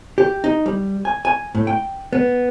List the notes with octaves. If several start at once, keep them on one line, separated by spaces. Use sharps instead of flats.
G4
D#4
G3
G#5
G#5
A2
G5
B3